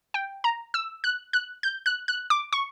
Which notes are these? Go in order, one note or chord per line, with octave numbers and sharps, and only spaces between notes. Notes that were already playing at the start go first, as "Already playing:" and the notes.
G5
A#5
E6
F#6
F#6
G6
F#6
F#6
D6
C#6